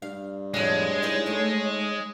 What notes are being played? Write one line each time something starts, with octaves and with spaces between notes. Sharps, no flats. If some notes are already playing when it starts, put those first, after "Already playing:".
G2 F5
F2 A2 F3 G#3 C#5
D#4 E4 C5
A3 D#4